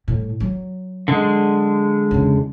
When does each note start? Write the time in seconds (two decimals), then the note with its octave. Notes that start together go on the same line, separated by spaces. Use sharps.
0.08 A2 G3
0.40 F#3
1.08 D3 G#3
2.11 E2 C#3